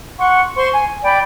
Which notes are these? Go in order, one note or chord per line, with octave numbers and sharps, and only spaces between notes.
F#5 C6 C#6
C5 C6 C#6
G#5
D5 G5 B5